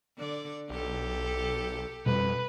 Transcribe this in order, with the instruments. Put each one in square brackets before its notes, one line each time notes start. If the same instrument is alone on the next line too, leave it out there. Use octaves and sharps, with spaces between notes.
[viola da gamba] D3 D5
[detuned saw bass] B1 [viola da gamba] G4 A4
[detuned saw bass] F2 [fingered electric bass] B2 G3 [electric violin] B4